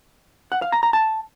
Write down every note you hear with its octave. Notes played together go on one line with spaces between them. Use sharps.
F#5
F5
A#5
A#5
A5